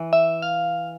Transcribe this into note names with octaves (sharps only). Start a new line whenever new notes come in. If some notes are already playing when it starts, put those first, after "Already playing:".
Already playing: E3
E5
F5